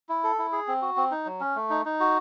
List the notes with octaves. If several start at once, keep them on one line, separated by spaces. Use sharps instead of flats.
E4
A4
E4
G#4
C4
F#4
C4
D#4
F#3
C#4
A3
D#4
D#4
F#4